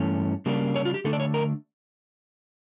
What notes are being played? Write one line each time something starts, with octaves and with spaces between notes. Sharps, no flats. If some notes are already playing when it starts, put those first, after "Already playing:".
Already playing: G2 E3 A3 C#4
C#3 G3 A#3 D4
C#5
F4
G4
D3 A3 D4 A4
D5
C#5
A#4